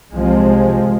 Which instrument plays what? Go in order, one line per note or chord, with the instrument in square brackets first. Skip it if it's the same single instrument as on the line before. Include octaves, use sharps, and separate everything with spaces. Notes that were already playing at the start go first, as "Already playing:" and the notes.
[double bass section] C2 C3 F3 G#3